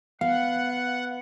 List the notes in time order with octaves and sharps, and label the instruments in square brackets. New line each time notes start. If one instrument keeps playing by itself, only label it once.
[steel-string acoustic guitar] B3 [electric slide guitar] F5 [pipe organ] F#5